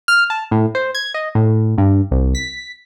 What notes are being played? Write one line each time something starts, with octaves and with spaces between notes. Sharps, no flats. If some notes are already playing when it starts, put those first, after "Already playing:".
F6
A5
A2
C5
G#6
D#5
A2
G2
C2
B6